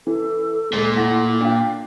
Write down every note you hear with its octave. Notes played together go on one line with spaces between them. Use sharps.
E3 A4
D2 A#2 G#3
A2 F#5 A#6
D4 F4 G5